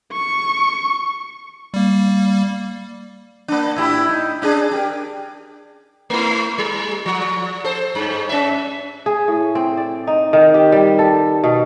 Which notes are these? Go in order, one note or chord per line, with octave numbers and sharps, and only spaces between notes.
C#6
G3 A#3
A#3 D4
A2 E4 G4
D#4
C#4 D4 G#4
G4 A#4
A3 E4
G3
F3
A4 C5
G2
C#4 E5
G#4
A2
C4
D5
D#4
D#3
G4
G3
A4
B2